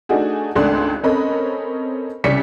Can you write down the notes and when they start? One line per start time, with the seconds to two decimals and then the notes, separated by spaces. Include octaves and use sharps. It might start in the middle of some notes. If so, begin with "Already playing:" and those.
0.09 A3 D4 D#4 F#4 G#4
0.55 G#1 C#2 A3 D4 C6 F#6
1.03 C4 C#4 A4 A#4 D#5 B5
2.24 C2 C#3 C#4 D5 B6 C#7